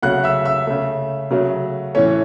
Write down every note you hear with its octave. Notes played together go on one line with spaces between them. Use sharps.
C#3 F#3 A3 F#5 F#6
E5 E6
E5 E6
C#3 A3
C#3 F#3 A3
A2 E3 A3 C#4 C#5